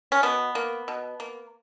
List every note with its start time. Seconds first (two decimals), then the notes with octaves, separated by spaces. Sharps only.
0.12 C#4
0.23 B2 B3
0.55 A#3
0.88 B2
1.20 A#3